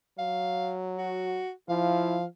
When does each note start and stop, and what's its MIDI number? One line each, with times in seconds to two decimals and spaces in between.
0.19 1.40 54
0.19 0.72 77
0.99 1.51 66
1.69 2.26 53
1.69 2.17 64
1.69 2.24 77